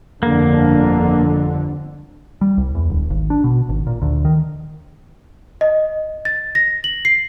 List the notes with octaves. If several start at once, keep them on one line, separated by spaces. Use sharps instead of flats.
G1 F2 D3 A#3
G3
C2
E2
D1
G#1
D4
B2
G#1
A#2
D2
D#3
D#5
A6
A#6
F#7
C7